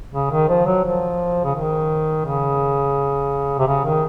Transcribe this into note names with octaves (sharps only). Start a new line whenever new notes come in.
C#3
D#3
F3
F#3
F3
C#3
D#3
C#3
C3
C#3
D#3